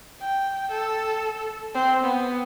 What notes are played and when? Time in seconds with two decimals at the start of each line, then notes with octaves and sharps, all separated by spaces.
0.21 G5
0.71 A4
1.74 C4
2.04 B3